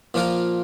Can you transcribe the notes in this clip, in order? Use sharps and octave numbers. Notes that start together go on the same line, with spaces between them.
A#2 F3 A#3 F4 A#4